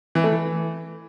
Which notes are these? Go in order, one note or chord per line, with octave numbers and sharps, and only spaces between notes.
E3
A3
E3